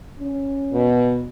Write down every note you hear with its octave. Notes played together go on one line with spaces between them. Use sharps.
C#4
B2